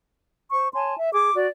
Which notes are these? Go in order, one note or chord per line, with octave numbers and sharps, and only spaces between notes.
C5 C#6
C#5 G#5 A5 C6
E5
G#4 D6
F#4 D5